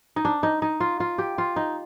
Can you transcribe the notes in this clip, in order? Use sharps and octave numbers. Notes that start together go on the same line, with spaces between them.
D#4
D4
D#4
D#4
F4
F4
G4
F4
D#4